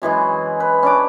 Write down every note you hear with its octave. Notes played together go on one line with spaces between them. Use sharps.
F#2 E3 G#3 G#4
B4
C#4 D4 D6